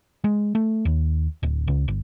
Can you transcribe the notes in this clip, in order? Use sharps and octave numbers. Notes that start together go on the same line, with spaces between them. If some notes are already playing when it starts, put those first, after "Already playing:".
G#3
A3
D#2
D1
C#2
G1